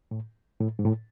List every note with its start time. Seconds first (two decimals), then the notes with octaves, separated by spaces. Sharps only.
0.11 A2
0.60 A2
0.79 G#2
0.85 A2